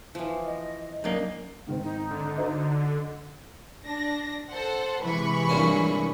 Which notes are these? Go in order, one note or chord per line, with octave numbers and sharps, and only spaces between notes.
E3 F3
D#5
F#2 A#3 D4 D#4
G#2 D#3 C4
D#4
D3
F#4 C5 D#5
D4 A#6
A4 C5 F#5
C3 E3 G#3 B4 B5 C#6
G2 A#2 C#4